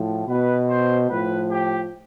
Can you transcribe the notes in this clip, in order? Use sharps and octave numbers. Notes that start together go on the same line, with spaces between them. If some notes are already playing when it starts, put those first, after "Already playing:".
Already playing: A2 F3
B2 B4
C5
A2 F3 B4
G4